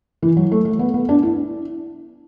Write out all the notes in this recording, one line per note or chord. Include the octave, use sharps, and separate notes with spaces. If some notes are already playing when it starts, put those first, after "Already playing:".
E3
F#3
A3
A3
B3
B3
D4
E4